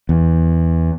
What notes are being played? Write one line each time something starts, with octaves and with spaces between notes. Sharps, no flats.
E2